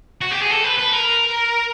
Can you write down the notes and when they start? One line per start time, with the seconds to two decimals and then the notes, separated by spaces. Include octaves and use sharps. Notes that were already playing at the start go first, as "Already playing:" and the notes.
0.21 F#4
0.31 G4
0.40 G#4
0.50 A4
0.65 B4
0.78 B4
0.93 A#4